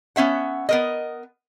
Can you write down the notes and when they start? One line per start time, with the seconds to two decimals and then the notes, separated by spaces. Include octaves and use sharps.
0.16 B3 C#4 E5 F#5
0.69 B3 A#4 D#5